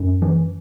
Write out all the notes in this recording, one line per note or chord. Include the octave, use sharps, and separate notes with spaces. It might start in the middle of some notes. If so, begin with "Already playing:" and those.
Already playing: F#2
E3